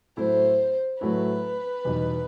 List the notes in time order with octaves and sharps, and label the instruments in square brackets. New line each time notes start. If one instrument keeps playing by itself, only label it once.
[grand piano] A2 F#3 A3 E4 [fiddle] C5
[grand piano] A2 F#3 A3 E4 [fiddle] B4
[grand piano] E2 B2 G3 D#4